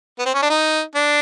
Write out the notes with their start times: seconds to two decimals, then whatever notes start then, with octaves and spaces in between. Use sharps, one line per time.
0.19 B3
0.26 C4
0.34 C#4
0.42 D4
0.50 D#4
0.95 D4